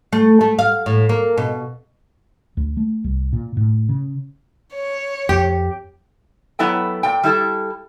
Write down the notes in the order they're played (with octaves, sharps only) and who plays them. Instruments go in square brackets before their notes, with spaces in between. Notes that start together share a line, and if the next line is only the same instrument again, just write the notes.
[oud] A3
A3
F5
A2
A#3
B2
[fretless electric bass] D2
A3
C2
A#2
A2
C#3
[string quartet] C#5
[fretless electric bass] F2 [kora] G4
[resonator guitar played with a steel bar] F#3 B3 E4 A4 G5
A#2 G5
G3 E4 A4